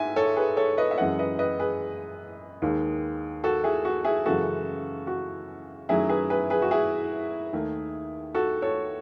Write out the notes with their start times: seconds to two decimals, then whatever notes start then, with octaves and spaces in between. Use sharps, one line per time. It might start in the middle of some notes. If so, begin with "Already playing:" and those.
Already playing: G#2 A3 E5 G#5
0.16 A4 C#5
0.36 G#4 B4
0.57 A4 C#5
0.77 B4 D#5
0.91 E5
0.98 F#2 E3 G#3 D#5 F#5
1.19 B4 D#5
1.39 B4 D#5
1.60 G#4 B4
2.62 D#2 D#3 G#3
3.44 F#4 A4
3.64 E4 G#4
3.85 F#4
4.05 E4 G#4
4.25 F#2 C#3 E3 G#3 F#4 A4
5.07 F#4
5.89 F#2 D#3 F#3 A3 E4 G#4
6.09 G#4 B4
6.30 G#4 B4
6.50 G#4 B4
6.62 F#4
6.71 E4 G#4
7.53 D#2 D#3 A3
8.35 F#4 A4
8.62 A4 C#5